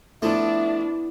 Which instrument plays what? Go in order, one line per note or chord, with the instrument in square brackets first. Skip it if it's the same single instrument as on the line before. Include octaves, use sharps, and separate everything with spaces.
[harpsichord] F3 A3 [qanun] B3 E4 [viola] D4 [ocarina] E5